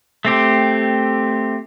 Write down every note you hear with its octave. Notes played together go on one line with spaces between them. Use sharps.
A3 C4 G4